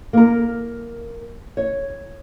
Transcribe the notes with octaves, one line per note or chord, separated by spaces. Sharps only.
A#3 A#4
C#5